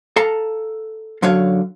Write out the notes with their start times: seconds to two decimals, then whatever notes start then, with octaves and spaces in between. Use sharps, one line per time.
0.16 A4 F5 A5 A#5
1.22 F#2 D3 F#3 C#5 F5